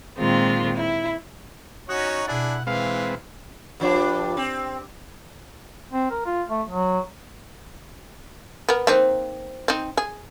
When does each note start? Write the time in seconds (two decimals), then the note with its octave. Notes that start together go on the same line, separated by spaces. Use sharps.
0.18 A#2 D#3 G#3 C4 F4
0.75 E4
1.89 C#4 D#4 F#4 C#5 F#5 C#6 D#6
2.28 B2 D4 E4 G#4 A6
2.67 E3 G#3 C4 B4 F5
3.80 G2 F3 D4
4.37 C4
5.92 C4
6.10 A#4
6.25 F4
6.49 A3
6.69 F#3
8.69 B3 A#4
8.87 A#3 C4 D#4 C5 F5
9.68 C4 D#4
9.97 G#4